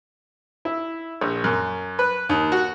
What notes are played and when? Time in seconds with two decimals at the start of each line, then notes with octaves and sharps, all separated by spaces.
0.65 E4
1.21 A#1
1.44 F#2
1.99 B4
2.29 D#2
2.52 F#4